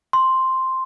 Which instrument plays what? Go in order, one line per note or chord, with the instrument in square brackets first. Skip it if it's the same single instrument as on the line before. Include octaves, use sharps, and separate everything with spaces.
[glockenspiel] C6